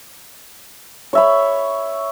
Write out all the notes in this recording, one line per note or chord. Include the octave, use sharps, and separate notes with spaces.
C#5 E5 B5